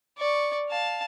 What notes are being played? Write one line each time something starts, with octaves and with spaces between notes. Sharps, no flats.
D5 C#6
F5 A5